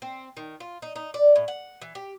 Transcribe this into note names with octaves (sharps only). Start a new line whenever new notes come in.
C4
D#3
F4
D#4
D#4
D5
A2
F#5
E3
G4